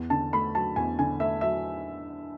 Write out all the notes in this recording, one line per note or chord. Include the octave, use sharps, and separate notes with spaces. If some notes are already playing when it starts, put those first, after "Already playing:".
Already playing: E2
D3 A5
A3 B5
F#3 A5
E2 G#5
D3 G#5
A3 E5
F#3 E5